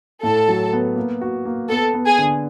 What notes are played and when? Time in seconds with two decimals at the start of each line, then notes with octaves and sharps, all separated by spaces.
0.23 A2 A4
0.48 F#3
0.73 B3
0.96 A#3
1.21 F#4
1.45 A#3
1.69 B3 A4
1.94 B3
2.06 G#4
2.18 D3